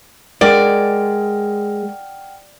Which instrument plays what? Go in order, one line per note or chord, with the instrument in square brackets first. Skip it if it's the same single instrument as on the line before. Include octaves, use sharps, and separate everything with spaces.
[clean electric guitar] G#3 [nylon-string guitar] A#4 [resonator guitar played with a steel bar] D5 [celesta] F#5 G5 F6